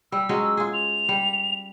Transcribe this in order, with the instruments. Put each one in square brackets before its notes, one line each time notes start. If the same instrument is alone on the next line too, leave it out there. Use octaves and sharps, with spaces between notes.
[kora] G3 [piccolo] E6
[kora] F#3 G#3 C#4
F4 G#4
[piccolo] F7
[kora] G3